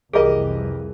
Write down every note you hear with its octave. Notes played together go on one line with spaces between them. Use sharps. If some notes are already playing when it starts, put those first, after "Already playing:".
C2 F2 E3 G4 G#4 A#4 D#5